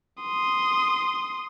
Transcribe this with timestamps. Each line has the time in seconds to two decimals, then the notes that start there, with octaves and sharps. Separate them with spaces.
0.23 C6 D#6